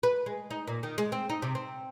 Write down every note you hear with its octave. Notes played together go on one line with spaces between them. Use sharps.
B4
G#3
D#4
A#2
D#3
G#3
C4
D#4
C3
C4